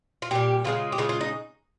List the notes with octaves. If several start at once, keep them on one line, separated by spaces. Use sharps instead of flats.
F4
A#2 G3 G4
C#3 F3 G#3 F4
G4
C#3 G#3 F4
F4
D#4